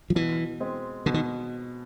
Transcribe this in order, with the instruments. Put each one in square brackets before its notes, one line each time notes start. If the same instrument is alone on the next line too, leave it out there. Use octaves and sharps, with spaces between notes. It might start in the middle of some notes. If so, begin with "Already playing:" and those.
[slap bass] F3
[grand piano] B2 [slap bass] E3
[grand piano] G#3 C4
[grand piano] B2 [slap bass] D3
[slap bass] D#3